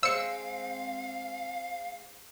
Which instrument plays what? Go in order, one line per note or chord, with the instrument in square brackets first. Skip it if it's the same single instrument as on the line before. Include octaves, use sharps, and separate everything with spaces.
[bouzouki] G#3 A#3 C4 [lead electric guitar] F5 [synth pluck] E6 C#7